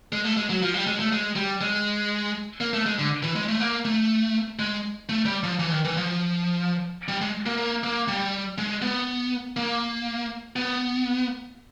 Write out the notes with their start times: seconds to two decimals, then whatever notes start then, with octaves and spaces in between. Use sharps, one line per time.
0.12 G#3
0.24 A3
0.37 G#3
0.50 F#3
0.62 F3
0.74 G3
0.87 G#3
1.00 A3
1.12 G#3
1.36 G3
1.61 G#3
2.61 A#3
2.73 A3
2.86 G#3
2.99 D3
3.23 E3
3.35 G#3
3.48 A3
3.60 A#3
3.85 A3
4.59 G#3
5.09 A3
5.25 G3
5.43 F3
5.59 E3
5.71 D#3
5.85 E3
5.97 F3
7.08 G3
7.21 G#3
7.46 A#3
7.58 A#3
7.83 A#3
8.08 G3
8.58 G#3
8.82 B3
9.56 A#3
10.56 B3